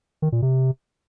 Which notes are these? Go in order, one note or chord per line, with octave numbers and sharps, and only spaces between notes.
D#3
A#2
C3